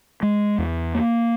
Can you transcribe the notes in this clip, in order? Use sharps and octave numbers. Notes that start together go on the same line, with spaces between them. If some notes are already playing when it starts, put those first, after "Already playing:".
G#3
E2
A#3